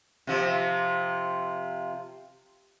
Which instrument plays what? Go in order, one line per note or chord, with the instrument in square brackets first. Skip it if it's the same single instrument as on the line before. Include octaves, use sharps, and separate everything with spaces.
[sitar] C3 F3